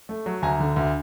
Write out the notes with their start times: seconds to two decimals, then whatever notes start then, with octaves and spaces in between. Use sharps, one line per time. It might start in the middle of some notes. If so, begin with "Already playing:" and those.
0.09 A3
0.26 F#3
0.42 D2 G#5 A#5
0.60 D3
0.76 D2